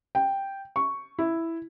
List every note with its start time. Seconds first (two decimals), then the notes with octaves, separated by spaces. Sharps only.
0.15 G5
0.76 C#6
1.19 E4